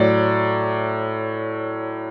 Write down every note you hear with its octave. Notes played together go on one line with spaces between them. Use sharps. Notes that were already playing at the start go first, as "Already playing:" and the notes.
Already playing: A2 F#3 D5